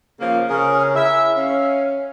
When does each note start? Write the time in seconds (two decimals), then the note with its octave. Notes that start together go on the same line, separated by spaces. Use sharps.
0.20 C#3 F3 A#3
0.49 C#3 C#4 G#4 A#4
0.95 E4 E5
1.37 C#4 F5